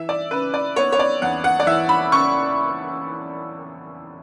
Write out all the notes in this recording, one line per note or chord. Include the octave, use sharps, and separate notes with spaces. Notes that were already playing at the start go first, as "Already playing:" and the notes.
Already playing: E3 E5
D5
C#3 B4
D5
B3 C#5
C#5
D5
E2 F#5
F#5
D5
E3 E5
B5
C#3 C#6